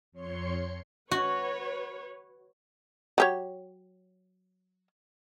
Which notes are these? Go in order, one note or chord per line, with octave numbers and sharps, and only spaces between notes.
F2 C#5 C6 C#7
F#4 B4 C#5
F#3 G4 C#5